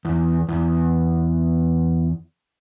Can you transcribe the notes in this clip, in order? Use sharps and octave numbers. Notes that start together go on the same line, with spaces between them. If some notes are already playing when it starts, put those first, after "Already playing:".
E2
E2